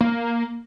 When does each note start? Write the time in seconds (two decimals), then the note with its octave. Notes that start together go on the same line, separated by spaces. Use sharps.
0.01 A#3